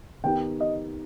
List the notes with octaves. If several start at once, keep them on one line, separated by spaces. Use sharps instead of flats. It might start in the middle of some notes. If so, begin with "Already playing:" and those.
D#3 B3 D#4 G4 G5
D#5